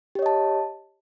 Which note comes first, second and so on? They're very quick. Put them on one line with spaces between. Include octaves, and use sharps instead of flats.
G4 C#5 D#5 A5